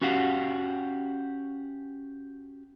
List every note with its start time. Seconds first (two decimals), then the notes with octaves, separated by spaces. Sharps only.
0.01 C#4 F#4 G4 F5 F#5